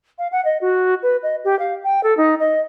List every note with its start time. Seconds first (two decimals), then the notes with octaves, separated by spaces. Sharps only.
0.19 F5
0.32 F#5
0.45 D#5
0.61 F#4
1.03 B4
1.23 D#5
1.44 G4
1.59 F5
1.84 G5
2.03 A4
2.17 D#4
2.40 D#5